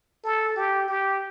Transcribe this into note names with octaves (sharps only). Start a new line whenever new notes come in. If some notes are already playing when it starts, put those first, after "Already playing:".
A4
G4
G4